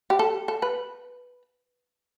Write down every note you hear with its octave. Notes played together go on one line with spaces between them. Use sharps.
G4
A4
A4
B4